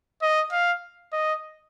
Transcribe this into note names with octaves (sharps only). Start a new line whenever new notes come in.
D#5
F5
D#5